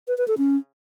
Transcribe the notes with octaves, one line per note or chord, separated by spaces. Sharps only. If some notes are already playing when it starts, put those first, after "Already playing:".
B4
B4
A4
C#4